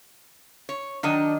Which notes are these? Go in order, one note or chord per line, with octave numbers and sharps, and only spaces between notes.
C#5
D#3 F#3 D4 D#5